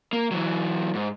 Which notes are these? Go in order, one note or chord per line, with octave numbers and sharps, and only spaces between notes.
A#3
E3 F#3
G#2